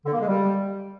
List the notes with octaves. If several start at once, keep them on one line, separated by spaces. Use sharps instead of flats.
D3
A#3
G#3
G3